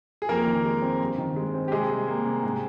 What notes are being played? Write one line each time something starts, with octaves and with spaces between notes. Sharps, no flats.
G#4
F2 A#3 A#4
D#3
G#3
C4
G2
D#3
G#3
C4
G4
C3 G#3 G#4
G3
A#3
C3
G#2